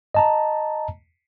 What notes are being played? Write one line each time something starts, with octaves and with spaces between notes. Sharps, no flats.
D#5 A5 A#5